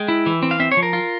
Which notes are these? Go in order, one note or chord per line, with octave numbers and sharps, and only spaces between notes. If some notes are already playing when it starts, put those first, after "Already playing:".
Already playing: G#3 G5
E4
E3
C4
F5
C4 E5
C#5
F3
A#4
F4